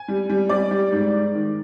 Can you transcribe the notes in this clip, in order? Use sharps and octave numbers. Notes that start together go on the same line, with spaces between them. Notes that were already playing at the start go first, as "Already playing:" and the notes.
Already playing: G#5
G3
G3
G3 D5
G3
G#2
G#2
D#3